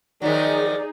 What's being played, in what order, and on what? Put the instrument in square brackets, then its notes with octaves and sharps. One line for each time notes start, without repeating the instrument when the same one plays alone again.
[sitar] D#3 F3 F#3 [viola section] D#4 G#4 [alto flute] D5